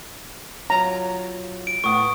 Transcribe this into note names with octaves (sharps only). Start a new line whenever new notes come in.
F#3 F4 A#5
D7
A2 B3 F#5 C#6 D#6